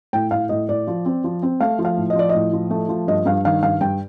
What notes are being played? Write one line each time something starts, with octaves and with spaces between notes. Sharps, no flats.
A2 G5
A2 F5
A2 D#5
A2 D5
F3
C4
F3
C4
A3 F5
F3
F5
A2
D#5
F3 D5
D#5
A2
F3
A3
F3
G2 D#5
G2 F5
D#3 F5
G2 F5
G2 G5